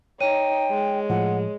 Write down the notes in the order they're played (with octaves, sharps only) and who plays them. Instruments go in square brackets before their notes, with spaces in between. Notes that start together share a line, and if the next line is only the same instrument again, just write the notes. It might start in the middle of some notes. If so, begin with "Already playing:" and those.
[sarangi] D#4 [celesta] C#5 D#7 [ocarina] G5
[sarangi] G#3
[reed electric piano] A2 F3 [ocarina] F#5